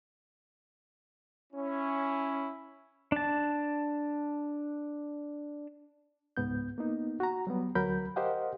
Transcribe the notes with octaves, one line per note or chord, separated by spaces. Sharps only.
C#4 E4
D4 A5
C#2 G#2 B3 G6
A#3 B3 D#4
F#4 A#5
F#3 G3 B3
D2 F#3 A#4 B5 G6
G4 A#4 C5 D#5 F5 F#5